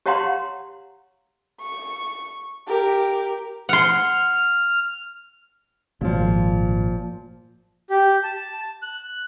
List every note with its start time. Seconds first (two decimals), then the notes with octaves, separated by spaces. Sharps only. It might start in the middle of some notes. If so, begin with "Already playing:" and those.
0.06 G4 C#5 F5 F#5 A#5 C6
1.62 C#6
2.67 G4 A#4
3.69 F#5 C6 F6
6.01 G#1 A#2 F3
7.90 G4
8.23 A5
8.82 F#6